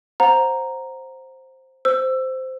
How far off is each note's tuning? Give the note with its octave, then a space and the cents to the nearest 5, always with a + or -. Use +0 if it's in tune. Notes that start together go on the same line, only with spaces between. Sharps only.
C5 +5 F#5 -25 A#5 +0
C5 -10 E6 +15